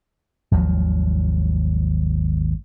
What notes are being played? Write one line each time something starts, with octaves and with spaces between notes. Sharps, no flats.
G#1 D#2 F3 F#3